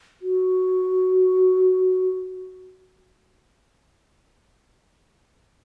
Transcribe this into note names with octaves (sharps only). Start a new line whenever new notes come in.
F#4